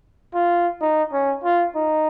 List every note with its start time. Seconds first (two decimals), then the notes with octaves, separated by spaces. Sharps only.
0.34 F4
0.81 D#4
1.13 C#4
1.44 F4
1.76 D#4